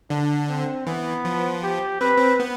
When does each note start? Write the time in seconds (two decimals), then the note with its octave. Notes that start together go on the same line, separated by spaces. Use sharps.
0.10 D3 D4
0.49 C4
0.87 E3 B3
1.25 F3
1.63 G4
2.01 C4 B4
2.17 C4
2.40 B3